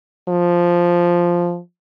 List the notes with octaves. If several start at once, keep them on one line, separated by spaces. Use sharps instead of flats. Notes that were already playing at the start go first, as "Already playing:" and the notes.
F3